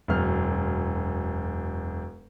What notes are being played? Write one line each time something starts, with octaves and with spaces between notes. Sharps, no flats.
E1 F#2 F6